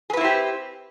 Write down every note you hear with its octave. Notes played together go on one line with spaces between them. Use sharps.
C4 E4 G4 G#4 B4